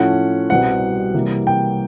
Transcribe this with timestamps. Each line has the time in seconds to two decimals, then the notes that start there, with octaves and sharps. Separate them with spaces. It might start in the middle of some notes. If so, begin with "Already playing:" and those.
Already playing: A2 F3 A3 C#4 F#5
0.50 C2 B2 G3 C4 F#5
1.14 C3 E3 G3 A#3
1.47 G5